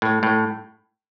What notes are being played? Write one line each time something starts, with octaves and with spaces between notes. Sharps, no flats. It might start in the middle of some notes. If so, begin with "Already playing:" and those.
A2
A2